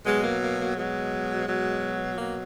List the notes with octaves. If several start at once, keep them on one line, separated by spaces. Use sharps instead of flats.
B2 F#3 G#3
A#3
A#3
A#3
B2 F#3 G#3
B2 F#3
B2 F#3 A#3